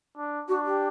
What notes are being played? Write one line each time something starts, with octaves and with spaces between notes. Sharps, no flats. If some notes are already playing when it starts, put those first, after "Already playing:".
D4
D4 F#4
G4